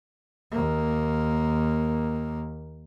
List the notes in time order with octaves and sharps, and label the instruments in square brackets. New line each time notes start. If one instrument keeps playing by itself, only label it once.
[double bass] D#2 A#3